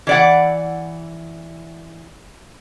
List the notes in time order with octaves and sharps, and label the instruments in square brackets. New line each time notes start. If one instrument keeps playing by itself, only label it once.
[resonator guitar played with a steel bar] E3 D5 F#5